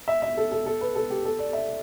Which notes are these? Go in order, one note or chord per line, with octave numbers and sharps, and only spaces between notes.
E5
E5
A4
A4
A4
B4
A4
G4
A4
D5
E5